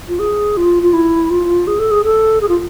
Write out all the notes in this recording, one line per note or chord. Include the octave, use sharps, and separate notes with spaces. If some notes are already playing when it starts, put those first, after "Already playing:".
F4
G#4
F4
F4
E4
F4
G#4
A4
G#4
A4
G#4
F4